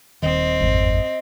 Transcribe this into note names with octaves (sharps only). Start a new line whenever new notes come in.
D#1 D#3 C4 D#5
G#1 F2